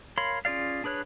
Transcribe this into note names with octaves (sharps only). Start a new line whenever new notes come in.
A#4 C#5 F5 B5 C6
C#4 F4 G#4 D5 F5
D4 G#4 B4 C#5 F#6